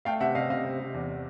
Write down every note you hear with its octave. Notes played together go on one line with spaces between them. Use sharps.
A3 F5 G5
C3 E5 F#5
C3 D#5 F5
C3 D#5 F5
C3
C3
E2